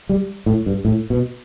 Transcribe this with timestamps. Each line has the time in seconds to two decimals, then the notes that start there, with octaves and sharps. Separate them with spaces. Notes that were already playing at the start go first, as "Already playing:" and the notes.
0.09 G3
0.46 A2
0.66 G2
0.85 A2
1.10 B2